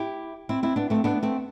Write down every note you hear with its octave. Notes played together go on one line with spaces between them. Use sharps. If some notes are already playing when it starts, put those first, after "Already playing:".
Already playing: E4 G4
C4 E4
C4 E4
B3 D4
A3 C4
B3 D4
A3 C4